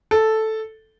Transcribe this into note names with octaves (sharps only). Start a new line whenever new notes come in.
A4